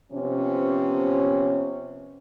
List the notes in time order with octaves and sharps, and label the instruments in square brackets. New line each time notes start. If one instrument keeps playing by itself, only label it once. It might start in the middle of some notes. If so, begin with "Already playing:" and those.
[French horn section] C3 F3 B3 C#4